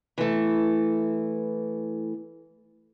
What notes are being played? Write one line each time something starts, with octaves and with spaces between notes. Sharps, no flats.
E3 A3